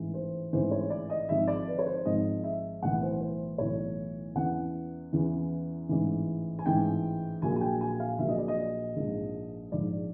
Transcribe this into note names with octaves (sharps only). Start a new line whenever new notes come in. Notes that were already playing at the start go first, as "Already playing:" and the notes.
Already playing: A1 G#2 E3
C5
A1 G#2 E3 C5
C#5
D5
D#5
G#1 G#2 F3 E5
D5
B4
C#5
C5
G#1 G#2 F3 D#5
E5
B1 A2 E3 F#5
C5
C5
B1 A2 E3 C#5
E2 C#3 E3 F#5
E2 C#3 E3
A1 G#2 E3
G#5
A1 G#2 E3 G5
A#1 A#2 F#3 G#5
G#5
G5
G#5
F5
A#1 A#2 F#3 E5
D#5
D5
D#5
A#1 G#2 F3
A#1 G#2 F3 D5